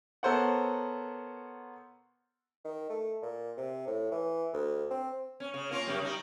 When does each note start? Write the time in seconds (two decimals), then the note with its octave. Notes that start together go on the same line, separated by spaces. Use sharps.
0.23 B3 A4 A#4 C5 C#5 F#5
2.65 D#3
2.90 A3
3.22 A#2
3.57 C3
3.87 A2
4.12 E3
4.53 D2
4.90 C4
5.40 C#4
5.54 C#3
5.71 A#3 C#4 F4
5.87 F#2 C#3 G3
6.02 G3 D#4